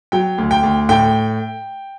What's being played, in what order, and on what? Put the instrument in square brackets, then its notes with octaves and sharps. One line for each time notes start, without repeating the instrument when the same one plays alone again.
[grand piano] F#3 G5
D2
G5
D2
A2 G5